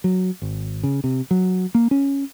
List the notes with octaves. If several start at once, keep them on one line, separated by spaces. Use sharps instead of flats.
F#3
G#1
C#3
C3
F#3
A#3
C#4